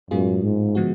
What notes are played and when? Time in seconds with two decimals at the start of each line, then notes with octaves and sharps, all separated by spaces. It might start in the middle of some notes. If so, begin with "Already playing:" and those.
0.11 F#2 A2 G#3 B3 F4 G#4
0.43 G#2
0.75 D3 F3 G#3 B3 F#4